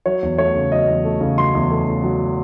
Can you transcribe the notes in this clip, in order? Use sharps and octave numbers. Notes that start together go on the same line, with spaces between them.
F#3 C#5
E2
A3 C#5
C#3
F#3 D#5
E2
A3
C#3
F#3 C6
E2
A3
C#3
F#3